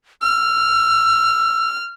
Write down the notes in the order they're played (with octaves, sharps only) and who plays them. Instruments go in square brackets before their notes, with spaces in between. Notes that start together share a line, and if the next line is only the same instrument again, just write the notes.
[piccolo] E6 [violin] F6